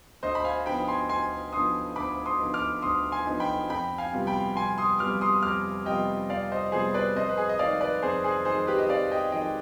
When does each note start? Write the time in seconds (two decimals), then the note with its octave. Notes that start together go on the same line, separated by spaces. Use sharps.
0.23 D2 C5 D#5
0.35 B5
0.44 F5 G#5
0.66 D3 F3 B3 D#4 G5 B5
0.88 G#5 C6
1.09 D2 G#5 C6
1.53 D3 F3 B3 D#4 C6 D#6
1.96 D2 B5 D6
2.26 C6 D#6
2.39 D3 F3 B3 D#4
2.54 D6 F6
2.82 D2 C6 D#6
3.12 G#5 C6
3.26 D3 F3 B3 D#4
3.40 G5 B5
3.69 F2 G5 B5
3.98 F5 G#5
4.12 C3 G3 B3 F4
4.27 G5 B5
4.56 F2 G#5 C6
4.78 C6 D#6
4.99 C3 G3 B3 F4 D6 F6
5.21 C6 D#6
5.42 F2 D6 F6
5.85 C3 G3 B3 F4 D#5 G5
6.29 F2 D5 F5
6.52 C5 D#5
6.72 C3 G3 B3 F4 G#4 C5
6.94 B4 D5
7.15 F2 C5 D#5
7.29 B4
7.37 G#4
7.49 D#5
7.59 D#3 G#3 D5 F5
7.81 B4 D5
8.02 F2 G#4 C5
8.24 G#4 C5
8.45 D#3 G#3 G#4 C5
8.67 G4 B4
8.78 D#5
8.89 F2 D5 F5
9.11 D#5 G5
9.32 D#3 G#3 D#5 G5